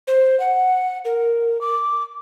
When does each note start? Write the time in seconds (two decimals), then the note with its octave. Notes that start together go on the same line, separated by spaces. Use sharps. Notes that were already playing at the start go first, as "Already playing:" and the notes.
0.08 C5
0.40 F#5
1.05 A#4
1.61 D6